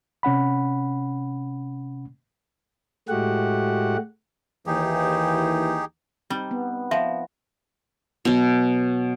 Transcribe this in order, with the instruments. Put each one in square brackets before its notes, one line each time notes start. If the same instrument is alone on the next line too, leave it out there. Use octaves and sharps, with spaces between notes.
[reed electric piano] C3 C#4 F#5 B5
[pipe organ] A2 G#3 A3 F#4 G4 F#5
[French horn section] D#2 E3 [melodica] D#4 G4 G#4
[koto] G3 [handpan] C4 D#4
[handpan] B3
[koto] F3 [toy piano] E5
[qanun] B2 F#3